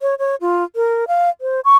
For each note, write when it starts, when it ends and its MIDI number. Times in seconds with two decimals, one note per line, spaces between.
0.01 0.15 73
0.19 0.35 73
0.41 0.64 65
0.76 1.05 70
1.08 1.30 77
1.41 1.60 72
1.65 1.77 85